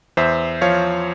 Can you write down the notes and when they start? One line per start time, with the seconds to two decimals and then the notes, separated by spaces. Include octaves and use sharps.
0.17 E2 C5 E5
0.61 F3 C#5 F5